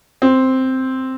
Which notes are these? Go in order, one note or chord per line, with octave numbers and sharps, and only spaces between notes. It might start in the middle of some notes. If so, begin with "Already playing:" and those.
C4